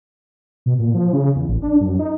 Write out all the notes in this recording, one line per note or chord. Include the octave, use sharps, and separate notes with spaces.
B2
A#2
F3
C#3
E2
A1
D4
F#2
D#4